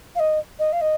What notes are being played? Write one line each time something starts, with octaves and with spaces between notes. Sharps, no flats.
F5
D#5
D#5
F5
D#5